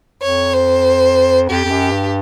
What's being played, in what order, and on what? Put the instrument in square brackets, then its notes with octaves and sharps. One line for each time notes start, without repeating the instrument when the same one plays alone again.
[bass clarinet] F2 [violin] C#5
[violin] C5
[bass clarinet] F2 [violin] G4
[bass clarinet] F2
F#2
G2